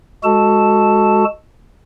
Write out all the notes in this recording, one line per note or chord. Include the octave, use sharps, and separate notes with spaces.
G#3 F#4 A4 A5